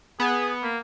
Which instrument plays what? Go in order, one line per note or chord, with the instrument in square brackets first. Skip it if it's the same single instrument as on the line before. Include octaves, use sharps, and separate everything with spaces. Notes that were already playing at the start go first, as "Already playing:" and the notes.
[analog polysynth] B3 [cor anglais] G#4
[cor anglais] A#3